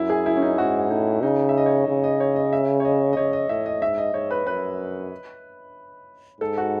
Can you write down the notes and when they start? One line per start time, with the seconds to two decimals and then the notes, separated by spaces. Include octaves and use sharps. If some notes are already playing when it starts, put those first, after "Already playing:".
Already playing: F#2 E4
0.10 G#4
0.26 E4
0.37 C#4
0.42 D#4
0.57 G#2 F#4
0.90 A2 D#4
1.22 C#3 D#4
1.49 E5
1.57 D#5
1.66 C#5
1.88 C#3
2.04 D#5
2.20 C#5
2.36 D#5
2.53 E5
2.80 C#5
2.85 D#5
3.13 D#5
3.17 C#3 C#5
3.33 D#5
3.49 A2 E5
3.66 D#5
3.82 G#2 E5
3.98 D#5
4.14 G#2 C#5
4.31 B4
4.46 F#2 B4
6.40 G#2 A4
6.58 F#4